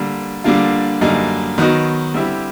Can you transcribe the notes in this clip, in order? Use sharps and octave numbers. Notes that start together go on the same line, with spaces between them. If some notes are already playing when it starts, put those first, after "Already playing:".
Already playing: D3 G3 A#3
D3 G3 A#3 D4 F4
F#2 D3 G3 A#3 D#4
D#3 F#3 B3 D#4 F#4
D3 G3 C4 E4 G4